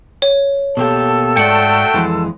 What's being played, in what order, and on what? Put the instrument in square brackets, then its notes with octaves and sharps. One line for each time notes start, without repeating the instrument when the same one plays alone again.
[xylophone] C#5
[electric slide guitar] B2 A#3 G4 [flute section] A4 A5 E6
[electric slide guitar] G#2 D5 [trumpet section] A3 F#4 G5 [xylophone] C#7
[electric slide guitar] F2 E3 G#3